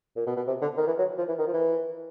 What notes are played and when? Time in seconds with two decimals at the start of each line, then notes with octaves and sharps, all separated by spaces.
0.16 A#2
0.26 B2
0.36 B2
0.47 C3
0.62 D3
0.77 D#3
0.87 E3
0.98 F#3
1.18 F3
1.28 E3
1.38 D#3
1.47 F3
1.53 E3